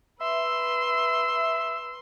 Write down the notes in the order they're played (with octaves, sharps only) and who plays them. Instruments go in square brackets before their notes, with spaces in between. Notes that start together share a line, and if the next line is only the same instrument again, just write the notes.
[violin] B4 C6 [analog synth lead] E5 [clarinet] E6